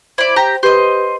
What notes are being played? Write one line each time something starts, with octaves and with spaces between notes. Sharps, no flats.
E4 C5 D5
G4 A#5
G4 B4 C5 D#5